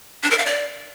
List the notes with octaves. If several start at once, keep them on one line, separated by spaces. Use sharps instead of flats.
D4
A#4
F5
D5